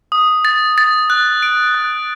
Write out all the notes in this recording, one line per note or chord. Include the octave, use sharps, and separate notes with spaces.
D#6
A6
A6
F#6
D7
F#6